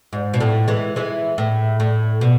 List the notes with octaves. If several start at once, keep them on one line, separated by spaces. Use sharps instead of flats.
G#2
B2
A2
E3 G#3
E3 G#3
A2
A2
B2